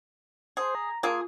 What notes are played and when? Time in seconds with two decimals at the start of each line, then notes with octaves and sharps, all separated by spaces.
0.57 G#4 C5
0.75 A#5
1.03 A#3 F4 G#4